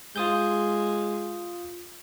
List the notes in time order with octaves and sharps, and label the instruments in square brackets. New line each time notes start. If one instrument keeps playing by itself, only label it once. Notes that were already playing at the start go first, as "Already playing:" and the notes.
[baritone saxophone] G#3 [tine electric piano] F4 D#6 G6